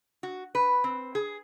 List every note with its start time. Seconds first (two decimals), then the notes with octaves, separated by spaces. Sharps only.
0.23 F#4
0.55 B4
0.84 C4
1.15 G#4